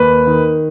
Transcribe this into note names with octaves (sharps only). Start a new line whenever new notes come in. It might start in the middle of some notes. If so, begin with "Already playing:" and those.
Already playing: D#2 B4
D#3